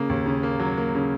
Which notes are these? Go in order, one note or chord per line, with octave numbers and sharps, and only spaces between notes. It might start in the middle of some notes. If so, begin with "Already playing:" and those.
Already playing: C#3 A#3
D#2
C#3
A#3
F#3
A#3
C#3